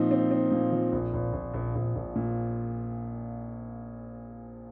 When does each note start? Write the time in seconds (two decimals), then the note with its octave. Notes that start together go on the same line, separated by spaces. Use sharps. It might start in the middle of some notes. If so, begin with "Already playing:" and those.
Already playing: A#2 F3 C4 D#4
0.11 C4
0.31 C4
0.52 A#2
0.72 F3
0.92 A#1
1.14 A#1
1.33 A#1
1.54 A#1
1.75 A#1
1.95 A#1
2.16 A#2